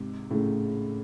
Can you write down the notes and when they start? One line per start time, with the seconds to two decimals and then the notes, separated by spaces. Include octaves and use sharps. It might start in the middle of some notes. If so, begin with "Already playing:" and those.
Already playing: G#2 C3
0.31 A2 C#3